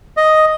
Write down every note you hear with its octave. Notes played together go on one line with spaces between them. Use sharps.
D#5